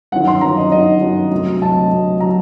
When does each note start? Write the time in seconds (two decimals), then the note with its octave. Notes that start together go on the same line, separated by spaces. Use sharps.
0.12 G1 F#2 D#3 F#5
0.28 C6
0.41 G1 F#2 D#3 A#5
0.57 D#5
0.72 G1 F#2 D#3 D#5
1.02 G1 F#2 D#3
1.31 D2 C3 F#3
1.62 D2 C3 F#3 A5
1.91 D2 C3 F#3
2.20 C3 F#3 A#5